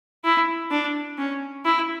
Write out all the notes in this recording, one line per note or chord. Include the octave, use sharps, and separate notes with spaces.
E4
D4
C#4
E4